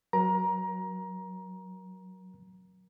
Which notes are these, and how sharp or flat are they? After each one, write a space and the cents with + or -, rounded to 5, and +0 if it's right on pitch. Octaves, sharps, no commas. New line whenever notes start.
F#3 +0 A#4 +30 A#5 +20